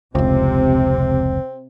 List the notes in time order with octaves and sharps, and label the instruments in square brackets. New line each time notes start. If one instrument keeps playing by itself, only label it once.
[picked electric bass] F1 C#2 [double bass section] C3 [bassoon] C4